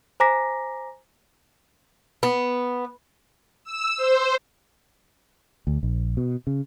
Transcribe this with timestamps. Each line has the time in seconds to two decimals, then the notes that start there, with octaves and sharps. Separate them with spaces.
0.20 C5 G#5 A#5 D6 A#6 B6
2.23 B3
3.64 E6
3.97 C5
5.67 D2
5.83 A#1
6.17 B2
6.47 C#3